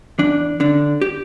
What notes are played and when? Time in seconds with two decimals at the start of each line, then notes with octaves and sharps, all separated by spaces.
0.19 E2 D4
0.60 D3 D4
1.02 G4